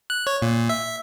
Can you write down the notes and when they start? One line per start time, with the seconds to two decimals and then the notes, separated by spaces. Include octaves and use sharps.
0.10 F#6
0.27 C#5
0.42 A#2
0.69 E5